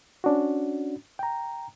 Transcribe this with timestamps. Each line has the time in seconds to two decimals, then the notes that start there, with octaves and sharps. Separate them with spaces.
0.24 C#4 D4 F#4
1.19 G5 A#5